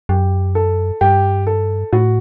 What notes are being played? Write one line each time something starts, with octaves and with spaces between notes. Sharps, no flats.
F#2 G4
A4
G2 G4
A4
A2 F#4